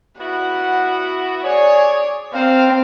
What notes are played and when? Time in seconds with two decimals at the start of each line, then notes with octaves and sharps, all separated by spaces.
0.20 B3 E4 F#4 F#5
1.45 G#4 C#5 D5
2.34 A#3 C4 C5 F5